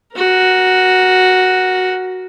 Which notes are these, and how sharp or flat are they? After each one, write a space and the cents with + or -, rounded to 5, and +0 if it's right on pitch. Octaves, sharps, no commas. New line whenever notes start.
F#4 +0 A#4 +15